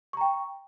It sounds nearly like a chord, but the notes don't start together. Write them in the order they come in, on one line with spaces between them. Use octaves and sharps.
C#6 A#5 G5